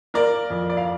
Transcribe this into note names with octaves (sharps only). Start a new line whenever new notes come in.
A#3 A#4 D5
F2
D5
F5